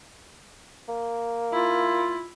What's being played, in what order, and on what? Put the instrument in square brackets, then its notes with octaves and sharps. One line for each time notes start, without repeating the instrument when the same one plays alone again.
[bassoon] A#3
[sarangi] E4 [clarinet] F4